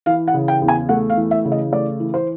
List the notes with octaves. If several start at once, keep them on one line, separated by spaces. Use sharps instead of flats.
E3 F5
F#5
C#3
G5
E2
G#5
A3 F#5
F5
E3
E5
C#3
D#5
A3 D5
E3
C5